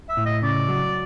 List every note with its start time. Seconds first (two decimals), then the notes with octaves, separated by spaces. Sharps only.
0.09 E5
0.17 A2
0.25 D#5
0.42 C#3 D5
0.68 F#3